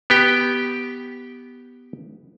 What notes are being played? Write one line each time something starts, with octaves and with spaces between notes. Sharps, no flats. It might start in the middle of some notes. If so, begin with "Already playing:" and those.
B3 G4 G5